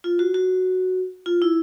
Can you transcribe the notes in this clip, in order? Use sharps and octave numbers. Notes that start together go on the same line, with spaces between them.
F4
F#4
F#4
F4
E4